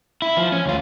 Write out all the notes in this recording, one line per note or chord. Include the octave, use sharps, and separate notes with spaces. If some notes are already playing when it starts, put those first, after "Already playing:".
E4
F3
C#4
D2 F4